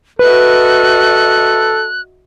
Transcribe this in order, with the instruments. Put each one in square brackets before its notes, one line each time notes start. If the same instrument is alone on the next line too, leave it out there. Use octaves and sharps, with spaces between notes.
[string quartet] F#4 D#5 E5 [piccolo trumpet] A4 [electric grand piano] B4 [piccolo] F#6